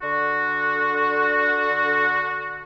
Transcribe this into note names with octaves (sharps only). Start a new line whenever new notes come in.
D3 F#4